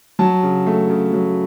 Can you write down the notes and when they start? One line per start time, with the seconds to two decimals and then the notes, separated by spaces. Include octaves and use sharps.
0.19 F#3 A5
0.43 C#3
0.67 A3
0.90 C#3
1.13 F#3